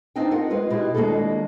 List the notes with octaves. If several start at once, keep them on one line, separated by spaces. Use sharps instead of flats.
B3 C4 D4 D#4 F#5 G5
F4 A#4 F#5
G#3 F4 B4 D#5
B2 E4 G4
D#2 G#3 A#3 D4 F4 A4